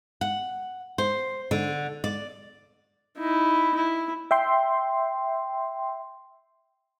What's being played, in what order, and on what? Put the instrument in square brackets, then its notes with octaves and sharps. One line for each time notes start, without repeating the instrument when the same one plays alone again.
[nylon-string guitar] F#5
C5
D3
D5
[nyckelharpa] D#4 E4
E4
[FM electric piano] E5 G5 C6